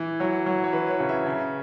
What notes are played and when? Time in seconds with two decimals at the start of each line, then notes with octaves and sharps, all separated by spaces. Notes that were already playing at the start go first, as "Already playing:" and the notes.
Already playing: E3
0.20 F#3 C#5
0.46 F#3
0.64 C#5
0.73 E3 B4
0.90 C#5
1.00 C#3
1.09 E5
1.26 C#3